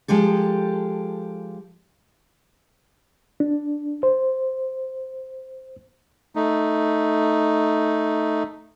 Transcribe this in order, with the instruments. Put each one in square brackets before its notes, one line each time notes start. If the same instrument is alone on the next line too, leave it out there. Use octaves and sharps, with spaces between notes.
[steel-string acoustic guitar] F3 G#3 G4 A4
[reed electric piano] D4
C5
[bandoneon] A3 D#4